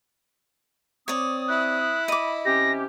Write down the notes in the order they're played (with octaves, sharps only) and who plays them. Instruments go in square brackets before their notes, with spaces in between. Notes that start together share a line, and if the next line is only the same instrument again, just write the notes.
[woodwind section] C4 D#6 [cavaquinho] C#5 D5
[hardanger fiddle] E4 [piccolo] F#6
[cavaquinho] D#5 D6 [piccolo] B5
[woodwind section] C3 C#4 G4 [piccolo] A#6